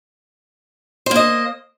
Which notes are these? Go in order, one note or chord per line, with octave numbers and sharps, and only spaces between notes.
A#3 C5 D#5